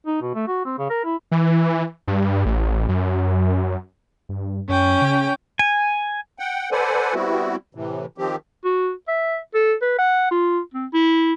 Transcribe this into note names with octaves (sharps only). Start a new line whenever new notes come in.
D#4
B2
A3
F#4
C4
C#3
A#4
E4
E3
G2
A1
F#2
G2
F#2 C#4 G5
C#3
G#5
F#5 G5
A4 B4 C5 D5 F#5 G#5
G3 B3 C4 E4 F#4
A2 C3 E3
D#3 F3 C4 G4
F#4
E5
A4
B4
F#5
F4
C4
E4